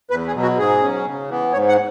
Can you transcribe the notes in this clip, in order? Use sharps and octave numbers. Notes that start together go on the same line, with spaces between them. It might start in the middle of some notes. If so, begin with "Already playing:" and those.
E2 B4
G#4
B2 F#3
F#4
G#2 G#4
F#3 C#4
C#3
E3 B3
G#2 C#5
F#5